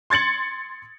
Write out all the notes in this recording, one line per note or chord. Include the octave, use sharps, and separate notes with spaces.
C6 G#6 A6 C#7 F#7